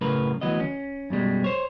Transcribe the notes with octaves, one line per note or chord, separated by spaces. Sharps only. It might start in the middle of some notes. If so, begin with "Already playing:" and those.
F#2 A2 C#3 A#4 B4
D2 E3 F#3 B3 D#5
C#4
F#2 B2 G3 G#3
C5 C#5